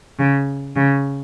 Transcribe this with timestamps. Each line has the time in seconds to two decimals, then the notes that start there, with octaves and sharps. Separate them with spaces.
0.19 C#3
0.76 C#3